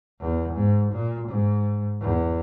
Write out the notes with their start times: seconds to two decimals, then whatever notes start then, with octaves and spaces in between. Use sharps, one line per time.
0.20 E2
0.55 G#2
0.92 A#2
1.29 G#2
2.01 E2